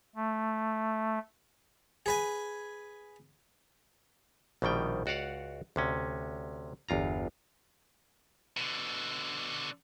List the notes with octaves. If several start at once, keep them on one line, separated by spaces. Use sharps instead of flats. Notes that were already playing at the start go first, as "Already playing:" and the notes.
A3
G#4 B4 G#5
A#1 B2 D#3 G3 G5
C#2 F#4 D5 F5 F#5
D2 C3 C#4
G1 E2 F4 A#5
B2 D3